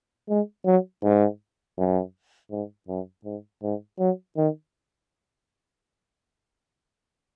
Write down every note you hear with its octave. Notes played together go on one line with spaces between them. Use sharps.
G#3
F#3
G#2
F#2
G#2
F#2
G#2
G#2
F#3
D#3